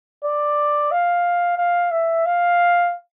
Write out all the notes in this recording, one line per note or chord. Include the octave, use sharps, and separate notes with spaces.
D5
F5
F5
E5
F5